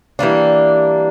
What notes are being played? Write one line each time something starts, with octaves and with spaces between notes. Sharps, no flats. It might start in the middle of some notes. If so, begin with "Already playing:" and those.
E3 G3 A#3 D4